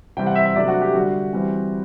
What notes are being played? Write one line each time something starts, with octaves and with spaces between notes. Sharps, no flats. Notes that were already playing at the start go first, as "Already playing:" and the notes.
C3 E3 G3 C4 G5
F#5
E5
E5
C3 F#3 A3 D4 D5
F#4
G4
D3 G3 D4 F#4
E3 G3 C4